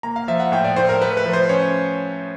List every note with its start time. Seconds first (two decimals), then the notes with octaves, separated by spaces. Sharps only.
0.03 A#3 A#5
0.16 F5
0.28 F3 E5
0.40 F#5
0.52 A2 G5
0.64 D5
0.76 A2 C5
0.89 A#4
1.01 A3 B4
1.17 B4
1.25 F3
1.33 C5
1.49 C#4 C#5